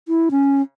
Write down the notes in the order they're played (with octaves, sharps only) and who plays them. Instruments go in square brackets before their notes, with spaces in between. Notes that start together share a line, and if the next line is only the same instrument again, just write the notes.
[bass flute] E4
C#4